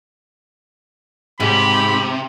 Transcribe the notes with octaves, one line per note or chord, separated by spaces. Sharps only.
G#2 C3 G4 B5